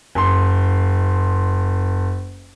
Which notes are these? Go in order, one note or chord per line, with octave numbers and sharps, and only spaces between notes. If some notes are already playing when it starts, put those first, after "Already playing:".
F#1 C6